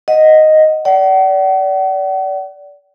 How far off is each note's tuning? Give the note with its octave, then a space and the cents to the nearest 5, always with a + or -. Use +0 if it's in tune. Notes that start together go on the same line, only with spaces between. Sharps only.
D#5 +0 F#5 +0
D5 -25 F#5 +40